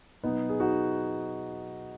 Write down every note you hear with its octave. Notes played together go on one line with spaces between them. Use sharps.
B2 F#3 B3 D#4
G#4
D#4 F#4